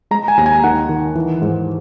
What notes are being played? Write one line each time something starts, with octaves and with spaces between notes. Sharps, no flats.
G#3 A#5
G#5
D#2 A#5
G#5
D#3 F#5
D#3
E3
G#2